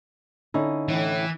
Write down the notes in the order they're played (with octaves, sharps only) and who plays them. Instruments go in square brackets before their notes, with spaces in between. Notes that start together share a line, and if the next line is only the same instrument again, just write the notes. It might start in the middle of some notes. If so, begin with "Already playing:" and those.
[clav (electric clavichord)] D3 C#4 E4 [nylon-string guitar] D#4
[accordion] A2 [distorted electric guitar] E3